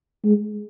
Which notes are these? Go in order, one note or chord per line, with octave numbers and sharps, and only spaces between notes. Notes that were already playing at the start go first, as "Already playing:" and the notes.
G#3